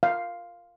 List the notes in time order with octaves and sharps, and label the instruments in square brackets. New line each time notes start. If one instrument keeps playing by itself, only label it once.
[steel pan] F5